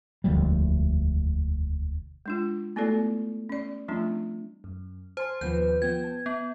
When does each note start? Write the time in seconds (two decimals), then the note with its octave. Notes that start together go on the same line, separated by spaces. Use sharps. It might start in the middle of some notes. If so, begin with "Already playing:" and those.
0.24 E1 D2 F3 G3
2.26 G#3 D4 F4
2.76 A3 B3 E4 F#4 A4 D5
3.49 C#4 D5
3.88 F3 G3 A3 C4 D4 F4
4.64 F#2
5.17 C5 G#5 A5 C6
5.41 D#2 B2 F3 B3 B4 C5 G6
5.82 F3 B3 G5 G#6
6.04 A5
6.26 B3